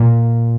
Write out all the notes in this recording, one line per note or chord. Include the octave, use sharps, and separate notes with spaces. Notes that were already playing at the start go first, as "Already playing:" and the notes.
Already playing: A#2